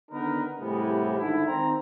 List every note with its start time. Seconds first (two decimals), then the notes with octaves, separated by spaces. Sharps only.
0.11 D3 D#3 B3 D#4 A#4 B4
0.59 A2 C3 E3 G3 G#3 B3
1.17 G#2 D3 D#3 E4
1.46 D#3 C4 A#5